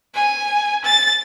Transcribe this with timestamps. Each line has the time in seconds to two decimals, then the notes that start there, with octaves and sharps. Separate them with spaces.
0.14 G#5
0.84 A6